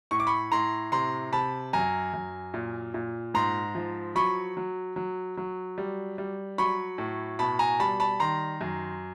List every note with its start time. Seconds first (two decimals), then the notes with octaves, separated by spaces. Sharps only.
0.11 A2 C#6
0.20 D6
0.27 B5 C#6
0.52 A2 A#5 C6
0.92 C3 A#5 C6
1.33 C3 A5 B5
1.73 F#2 G#5 A#5
2.13 F#2
2.54 A#2
2.94 A#2
3.34 G#2 A#5 C6
3.75 F3
4.15 F#3 B5 C#6
4.57 F#3
4.96 F#3
5.37 F#3
5.78 G3
6.18 G3
6.58 F#3 B5 C#6
6.98 A2
7.39 B2 A5 B5
7.59 G#5 A#5
7.80 G3 A5 B5
8.00 A5 B5
8.20 D#3 A#5 C6
8.61 F#2